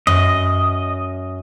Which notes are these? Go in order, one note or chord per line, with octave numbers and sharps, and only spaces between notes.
F#2 D#5